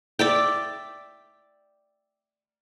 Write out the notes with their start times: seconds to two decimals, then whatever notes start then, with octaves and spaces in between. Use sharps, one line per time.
0.19 D5 E5 G5